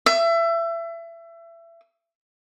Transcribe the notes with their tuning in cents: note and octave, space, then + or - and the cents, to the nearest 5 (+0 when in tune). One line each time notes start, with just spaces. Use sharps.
E5 +25